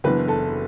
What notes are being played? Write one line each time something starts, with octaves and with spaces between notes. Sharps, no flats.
F#1 F#2 E3 B3 D4 B4
A4